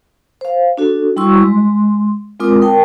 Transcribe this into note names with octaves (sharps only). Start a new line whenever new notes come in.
C5 F5
D4 F#4 A4
G3 E4 F#4 C6 C#6 E6
G#3 C6
G#3 C4 F4 A#4 D6 D#6
A#4 G5 A5